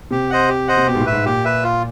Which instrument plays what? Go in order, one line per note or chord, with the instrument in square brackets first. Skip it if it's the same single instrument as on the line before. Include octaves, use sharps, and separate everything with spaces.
[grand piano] C3 [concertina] G4
[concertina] C5 D#5 F#5
G4
C5 D#5 F#5
[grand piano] C3
[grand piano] B2 [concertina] G4
[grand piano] G#2
A2
[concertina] B4 E5
[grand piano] G#2
[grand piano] A#2 [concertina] G4
[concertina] B4 E5
F4